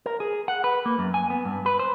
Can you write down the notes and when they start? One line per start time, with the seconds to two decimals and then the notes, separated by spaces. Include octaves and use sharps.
0.06 A#4
0.20 G#4
0.48 F#5
0.64 B4
0.86 A#3
0.99 F#2
1.14 G#5
1.30 B3
1.45 G2
1.66 B4
1.79 C5